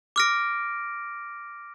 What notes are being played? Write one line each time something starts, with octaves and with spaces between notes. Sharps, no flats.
D6 F6 A#6 D7